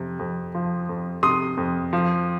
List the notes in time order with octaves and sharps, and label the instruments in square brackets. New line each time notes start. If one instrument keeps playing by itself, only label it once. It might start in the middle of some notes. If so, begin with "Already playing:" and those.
Already playing: [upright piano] F2 C3
F2
F3
F2
C3 C6 D#6
F2
F3